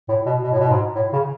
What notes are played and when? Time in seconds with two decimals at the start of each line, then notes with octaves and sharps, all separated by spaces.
0.08 A2
0.26 B2
0.43 B2
0.51 A2
0.60 B2
0.70 G#2
0.95 A2
1.13 C#3